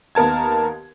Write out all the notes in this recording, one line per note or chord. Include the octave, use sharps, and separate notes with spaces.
D#2 B3 A#4 A5 G#6